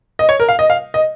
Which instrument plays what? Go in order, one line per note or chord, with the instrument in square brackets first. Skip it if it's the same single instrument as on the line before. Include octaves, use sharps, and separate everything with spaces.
[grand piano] D#5
C#5
A#4
F5
D#5
F5
D#5